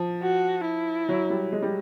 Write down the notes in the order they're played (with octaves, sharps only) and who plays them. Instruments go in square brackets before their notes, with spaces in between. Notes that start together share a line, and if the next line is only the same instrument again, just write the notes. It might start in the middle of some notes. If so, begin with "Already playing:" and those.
Already playing: [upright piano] F3
[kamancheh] F#4
E4
[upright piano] F#3
G3
G#3
G3